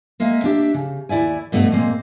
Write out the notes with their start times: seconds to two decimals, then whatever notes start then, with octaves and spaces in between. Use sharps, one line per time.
0.20 G#3 A#3 E5
0.44 D4 G4 E5
0.74 C#3
1.09 D#2 E4 D5 E5 G#5
1.52 G2 B2 A3 C#4 A4 D#5
1.72 A#2 G#3 A#3 C4